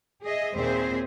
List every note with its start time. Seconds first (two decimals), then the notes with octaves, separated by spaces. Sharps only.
0.23 G#4 D#5 E5
0.54 D#2 A#2 C4 G#4 C5 E5